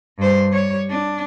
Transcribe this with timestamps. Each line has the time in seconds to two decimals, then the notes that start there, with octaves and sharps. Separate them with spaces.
0.18 G2 C5
0.50 G3 C#5
0.90 D4